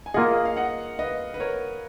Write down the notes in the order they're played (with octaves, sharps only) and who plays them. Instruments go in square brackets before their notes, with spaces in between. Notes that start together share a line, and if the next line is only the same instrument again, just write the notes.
[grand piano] G#5
[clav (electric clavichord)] A#3 F4 G#4 [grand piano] D#5 F#5
[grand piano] D#5
F5
D#5 F#5
B4 D#5
B4
A#4 C#5